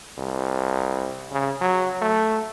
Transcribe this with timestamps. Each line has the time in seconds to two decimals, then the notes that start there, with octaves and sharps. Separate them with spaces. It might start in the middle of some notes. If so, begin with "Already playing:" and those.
0.18 C2
1.32 C#3
1.61 F#3
2.02 A3